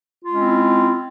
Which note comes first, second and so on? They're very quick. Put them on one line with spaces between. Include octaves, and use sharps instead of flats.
F4 G#3 C#4 C4 E4